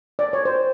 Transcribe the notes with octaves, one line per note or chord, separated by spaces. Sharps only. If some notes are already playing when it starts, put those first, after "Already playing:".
D5
C#5
C5